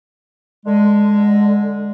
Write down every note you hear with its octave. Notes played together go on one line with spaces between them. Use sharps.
D3 G#3